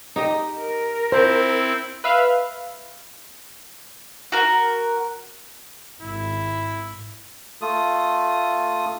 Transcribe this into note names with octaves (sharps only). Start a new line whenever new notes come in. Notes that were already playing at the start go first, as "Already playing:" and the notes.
D#4 G4 D#5
A#4
C4 E4 C5
B4 E5 F5
F#4 A#4
G#1 E4
A3 F4 D#6